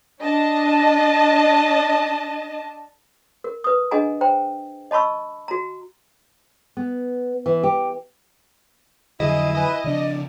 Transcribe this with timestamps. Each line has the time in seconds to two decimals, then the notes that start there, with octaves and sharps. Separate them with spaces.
0.23 D4 D#5 A5
3.44 A#4
3.64 B4 D#6
3.91 D4 G#4 D#5 F#5 G#5 A#5
4.21 C5 G5 A#5
4.91 D#5 A5 B5 C#6 E6
5.48 F#4 A#5
6.77 B3
7.46 E3
7.63 G4
9.20 F2 D3 F#3 E4 G#4 D#5
9.55 B4 D#5 G#5
9.84 C#3 F3 D4 D5